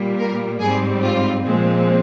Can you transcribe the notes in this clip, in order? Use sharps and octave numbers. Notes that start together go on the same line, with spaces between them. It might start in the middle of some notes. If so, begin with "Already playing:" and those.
Already playing: A#2 G3 A#3
A#4
G#2 G3 C4 G#4
F4
A#2 F3 G#3 C4